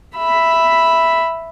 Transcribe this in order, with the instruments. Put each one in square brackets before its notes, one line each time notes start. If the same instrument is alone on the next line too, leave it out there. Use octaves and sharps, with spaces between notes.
[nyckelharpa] E5 B5